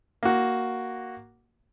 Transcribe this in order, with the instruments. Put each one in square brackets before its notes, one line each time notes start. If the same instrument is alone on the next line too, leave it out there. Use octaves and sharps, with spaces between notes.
[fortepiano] A#3 F#4